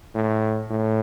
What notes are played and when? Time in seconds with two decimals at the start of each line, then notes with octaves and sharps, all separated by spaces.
0.15 A2
0.70 A2